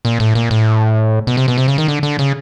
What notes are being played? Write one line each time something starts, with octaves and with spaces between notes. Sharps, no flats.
A#2
A2
A#2
A2
B2
C3
B2
C3
C#3
D#3
D3
D3
C#3